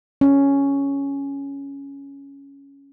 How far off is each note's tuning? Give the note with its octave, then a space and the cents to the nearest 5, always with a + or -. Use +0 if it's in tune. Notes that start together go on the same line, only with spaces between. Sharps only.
C#4 +5